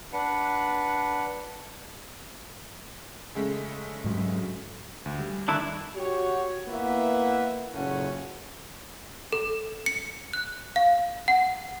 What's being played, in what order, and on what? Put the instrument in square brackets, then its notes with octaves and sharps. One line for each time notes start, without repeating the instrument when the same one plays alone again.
[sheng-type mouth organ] D4 B4 F#5
[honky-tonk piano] C#3 G#3 A3
[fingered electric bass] G#2 F#3
[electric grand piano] D2
G3
[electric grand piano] D3 D#3 [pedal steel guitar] A3 D4 E4
[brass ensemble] F#4 G4 C#5
A#3 B3 E4 B4 E5 F#5
F#1 A#2 C#3 A3 C#4 F#5
[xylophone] A4
C#7
F#6
F5
F#5